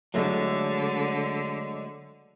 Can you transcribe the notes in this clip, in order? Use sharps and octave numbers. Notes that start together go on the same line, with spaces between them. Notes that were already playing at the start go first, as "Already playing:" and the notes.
D3 F#3 G#3 A3